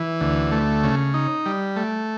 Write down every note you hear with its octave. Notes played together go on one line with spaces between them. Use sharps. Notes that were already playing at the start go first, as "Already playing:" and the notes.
Already playing: E3
D2
A3
C#3
D#4
G3
A3